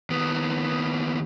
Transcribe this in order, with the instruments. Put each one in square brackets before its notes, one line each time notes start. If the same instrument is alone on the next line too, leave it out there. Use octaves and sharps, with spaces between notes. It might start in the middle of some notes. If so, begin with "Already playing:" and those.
[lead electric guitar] D#2 B3